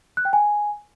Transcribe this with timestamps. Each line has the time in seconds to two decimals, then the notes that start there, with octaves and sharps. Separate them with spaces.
0.17 F#6
0.25 G5
0.33 G#5